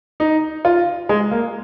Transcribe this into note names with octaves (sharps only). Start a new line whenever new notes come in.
D#4
F4
G#3
A#3